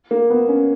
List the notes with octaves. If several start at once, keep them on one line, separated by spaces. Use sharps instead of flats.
A#3
B3
C#4